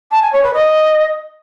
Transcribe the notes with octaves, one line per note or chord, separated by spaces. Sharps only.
A5
G#5
C#5
B4
D#5